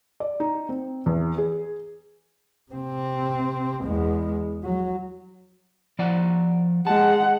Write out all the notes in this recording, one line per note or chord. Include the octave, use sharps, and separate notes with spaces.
D5
D#4
C4
E2
G#4
C3 C4
E2 G#3
F#3
F3 D5 F#5
G#3 F#5 A5